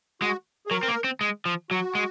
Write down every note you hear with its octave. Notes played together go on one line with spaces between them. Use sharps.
G#3 F#4
G#4
F#3 A#4
C4
A#3
C4
G#3
F3
F#3 F#4
G#3